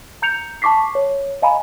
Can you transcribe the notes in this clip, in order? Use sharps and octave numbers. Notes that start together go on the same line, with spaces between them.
A#5 G6 C#7 F7
A5 C#6 D6 B6 C7
C#5
D#5 F5 G#5 A#5 B5